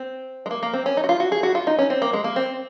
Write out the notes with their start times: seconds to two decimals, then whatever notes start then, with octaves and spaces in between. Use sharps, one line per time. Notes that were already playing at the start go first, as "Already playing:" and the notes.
Already playing: C4
0.46 G#3
0.51 A#3
0.63 A#3
0.73 C4
0.86 C#4
0.97 D#4
1.04 F#4
1.09 F4
1.20 F#4
1.32 G#4
1.43 F#4
1.55 F4
1.67 D#4
1.79 C#4
1.90 C4
2.02 A#3
2.13 G#3
2.24 A#3
2.36 C4